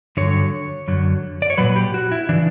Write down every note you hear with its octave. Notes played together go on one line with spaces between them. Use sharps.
G2 D3 F#3 C#5
F#2 D3 F#3
D5
C#5
A#2 F#3 B4
G4
F#4
E4
C#3 E3 D4